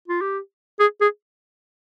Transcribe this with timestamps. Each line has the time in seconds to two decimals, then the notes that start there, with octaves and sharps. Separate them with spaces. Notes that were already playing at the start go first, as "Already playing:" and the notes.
0.08 F4
0.21 G4
0.80 G#4
1.01 G#4